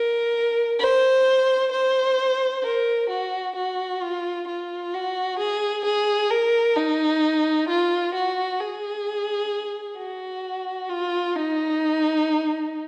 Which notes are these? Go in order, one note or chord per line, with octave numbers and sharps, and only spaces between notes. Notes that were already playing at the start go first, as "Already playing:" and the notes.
Already playing: A#4
C5
C5
A#4
F#4
F#4
F4
F4
F#4
G#4
G#4
A#4
D#4
F4
F#4
G#4
F#4
F4
D#4